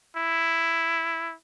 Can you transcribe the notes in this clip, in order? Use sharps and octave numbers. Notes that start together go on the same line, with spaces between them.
E4